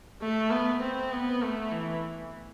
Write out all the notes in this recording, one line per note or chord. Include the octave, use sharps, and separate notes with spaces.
A3
B3
C4
B3
A3
E3